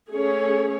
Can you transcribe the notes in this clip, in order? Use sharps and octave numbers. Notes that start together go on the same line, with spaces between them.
A3 C#4 G#4 C#5